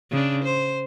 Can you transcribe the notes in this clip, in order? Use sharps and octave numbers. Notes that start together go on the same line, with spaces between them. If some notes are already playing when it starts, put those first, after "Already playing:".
C#3 D4
C5